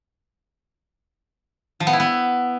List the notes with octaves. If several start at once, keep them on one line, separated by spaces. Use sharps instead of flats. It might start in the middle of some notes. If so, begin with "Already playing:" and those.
F3
B3
E4
B3